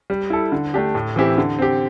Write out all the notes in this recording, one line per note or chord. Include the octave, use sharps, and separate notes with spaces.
G3
E4 A4
D3
A3 D4 G4
A2
E3 C4 E4 G4
D3
C4 G4